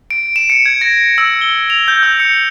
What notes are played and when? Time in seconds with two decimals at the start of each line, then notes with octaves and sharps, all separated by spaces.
0.11 D7
0.36 E7
0.50 C#7
0.66 G#6
0.81 A#6
1.18 E6
1.41 G7
1.70 F7
1.88 G6
2.03 E6
2.20 C#7